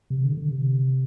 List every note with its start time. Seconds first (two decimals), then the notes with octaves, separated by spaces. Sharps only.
0.10 C3
0.24 D3
0.37 D3
0.51 C3